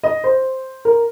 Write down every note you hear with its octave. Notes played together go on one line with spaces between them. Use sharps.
D#5
C5
A#4